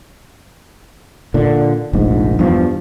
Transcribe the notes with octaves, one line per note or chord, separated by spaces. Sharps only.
A#2 D3
F1 A#1 G#2
E2 G2 F3